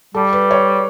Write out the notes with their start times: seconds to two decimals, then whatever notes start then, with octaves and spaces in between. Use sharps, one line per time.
0.14 G3 A4
0.33 B4
0.51 C#5